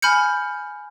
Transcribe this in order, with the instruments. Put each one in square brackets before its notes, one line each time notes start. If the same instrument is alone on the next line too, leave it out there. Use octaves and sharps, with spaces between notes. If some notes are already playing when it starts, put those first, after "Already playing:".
[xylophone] G#5 B5 F6 G6 C#7